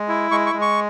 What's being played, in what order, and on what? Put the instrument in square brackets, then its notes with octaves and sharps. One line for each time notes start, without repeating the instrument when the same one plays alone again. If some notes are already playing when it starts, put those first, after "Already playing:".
Already playing: [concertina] G#3
E4
G#3 C#6
C#6
G#3
C#6